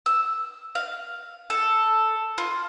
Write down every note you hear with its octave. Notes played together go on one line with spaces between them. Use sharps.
E6
F5
A4
F4